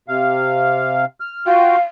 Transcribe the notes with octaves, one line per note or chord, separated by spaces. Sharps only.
C3 F5
F6
F4 F#4 F5 G5